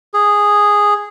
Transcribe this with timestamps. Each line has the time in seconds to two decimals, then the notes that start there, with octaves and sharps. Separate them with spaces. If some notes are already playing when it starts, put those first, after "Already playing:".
0.14 G#4